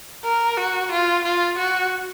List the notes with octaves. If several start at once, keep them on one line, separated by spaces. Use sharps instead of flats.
A#4
F#4
F4
F4
F#4